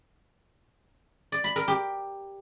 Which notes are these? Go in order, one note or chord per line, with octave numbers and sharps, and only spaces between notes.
D5
B5
A#4
G4